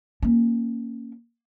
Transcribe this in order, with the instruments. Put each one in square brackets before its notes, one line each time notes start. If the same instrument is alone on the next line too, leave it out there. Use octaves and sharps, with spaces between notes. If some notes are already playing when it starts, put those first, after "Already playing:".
[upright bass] A#3 C#4